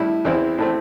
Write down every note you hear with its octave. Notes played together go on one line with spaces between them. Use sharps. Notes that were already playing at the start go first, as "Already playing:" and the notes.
Already playing: A2 G3 E4
E2 E3 C4 E4
A2 A3 C4